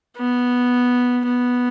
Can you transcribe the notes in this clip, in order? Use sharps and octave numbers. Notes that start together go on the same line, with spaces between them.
B3
B3